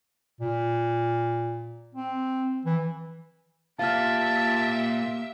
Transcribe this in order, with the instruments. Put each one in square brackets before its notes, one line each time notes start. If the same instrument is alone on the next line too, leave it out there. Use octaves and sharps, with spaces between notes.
[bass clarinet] A#2
C4
E3
[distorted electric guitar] A#3 F4 [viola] G4 E5 [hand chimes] F5 F6 [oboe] A5